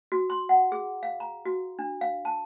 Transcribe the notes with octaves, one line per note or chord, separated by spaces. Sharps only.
F#4
C6
F#5
G#4
F5
A#5
F#4
D4
F5
A5